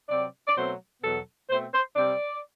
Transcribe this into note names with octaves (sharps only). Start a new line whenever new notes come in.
C3 F#3 C4 D5
D5
B2 F#3 A3 C4 C5
E2 B2 F#3 B3 A4
B2 A3 C4 C5
C5
C3 G3 C4 D5